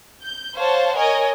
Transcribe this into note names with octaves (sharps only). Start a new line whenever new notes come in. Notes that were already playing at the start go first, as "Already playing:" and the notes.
G6
C5 C#5 F5 F#5 A5
A#4 C#5 D#5 G#5